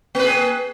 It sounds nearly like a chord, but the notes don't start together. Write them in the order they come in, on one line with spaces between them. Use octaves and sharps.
A#3 B4 G#4